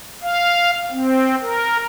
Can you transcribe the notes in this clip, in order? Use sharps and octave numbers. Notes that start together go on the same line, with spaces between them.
F5
C4
A#4